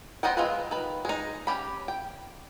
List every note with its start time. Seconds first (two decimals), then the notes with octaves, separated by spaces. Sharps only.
0.23 B3 C5 D#5 F#5 G5
0.37 G#3 C4 F4 G#4 B4
0.71 D#3 B4
1.05 G#3 D#4
1.47 C#4 G4 B5
1.88 G5